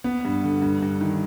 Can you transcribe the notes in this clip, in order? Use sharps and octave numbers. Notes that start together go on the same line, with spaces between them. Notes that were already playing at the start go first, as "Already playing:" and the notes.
B3
G2
D3
G2
G2
D#3